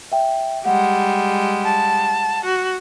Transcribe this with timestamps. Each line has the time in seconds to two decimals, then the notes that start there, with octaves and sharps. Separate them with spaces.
0.12 E5 G5
0.65 G3 G#3 F#5
1.65 A5
2.45 F#4